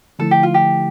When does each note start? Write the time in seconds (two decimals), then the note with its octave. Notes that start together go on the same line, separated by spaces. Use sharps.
0.19 D3 F3 A3 E4 A4
0.31 G4
0.43 F4
0.54 G4